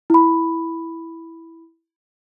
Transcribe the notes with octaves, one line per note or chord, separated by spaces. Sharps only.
E4 B5